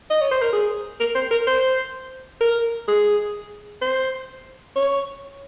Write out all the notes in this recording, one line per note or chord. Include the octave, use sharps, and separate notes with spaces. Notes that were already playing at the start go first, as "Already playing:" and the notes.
D#5
C#5
C5
A#4
G#4
A#4
C5
A#4
C5
A#4
G#4
C5
C#5